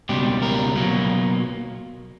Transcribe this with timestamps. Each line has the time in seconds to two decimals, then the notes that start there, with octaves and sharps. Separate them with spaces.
0.09 C#2 B2 G3 G4
0.42 A#4
0.76 B2 F#3 A#3